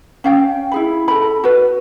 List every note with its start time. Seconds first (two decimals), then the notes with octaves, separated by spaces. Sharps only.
0.24 C#4 F5 G5
0.72 E4 G#4 B5
1.08 A4 B5
1.44 F#4 B4